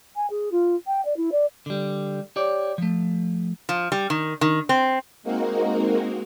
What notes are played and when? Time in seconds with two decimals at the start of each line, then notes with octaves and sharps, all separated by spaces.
0.16 G#5
0.30 G#4
0.52 F4
0.87 G5
1.05 D5
1.17 E4
1.32 D5
1.66 D3 G3
2.36 G4 C#5 D5
2.78 F3 A3
3.69 F3
3.92 G3
4.10 D#3
4.41 D#3
4.69 C4
5.23 G#3 A#3 C4 D#4 F#4 A#4